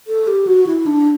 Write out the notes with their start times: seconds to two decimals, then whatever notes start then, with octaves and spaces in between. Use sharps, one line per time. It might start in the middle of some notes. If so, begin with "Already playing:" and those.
0.07 A4
0.27 G4
0.47 F#4
0.67 E4
0.86 D4